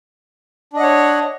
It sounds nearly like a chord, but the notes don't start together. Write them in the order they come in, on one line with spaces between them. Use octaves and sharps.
D4 D#5 F#5 C#5